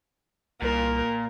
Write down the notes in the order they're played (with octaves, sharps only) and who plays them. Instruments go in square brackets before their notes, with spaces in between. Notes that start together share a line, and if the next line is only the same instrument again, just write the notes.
[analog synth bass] C2 [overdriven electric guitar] A#2 [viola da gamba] A#4